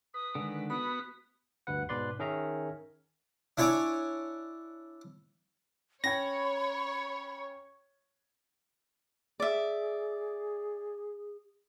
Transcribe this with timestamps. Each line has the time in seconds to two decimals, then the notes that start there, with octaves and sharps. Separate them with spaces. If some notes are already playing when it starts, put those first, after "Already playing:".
0.14 B4 D#6
0.35 D3 D#3 G#3
0.70 B3 F#4 B4 B5 D#6
1.67 D2 G2 B4 F#5
1.89 G#2 B2 B4 D5 C6
2.19 D#3 C#4 G#4 A#4 E5 A#5
3.57 D4 E4 C#5 G#5 C#6 D6
6.04 C#4 C#5 G5 B5 G#6 A#6
9.40 G#4 D5 E5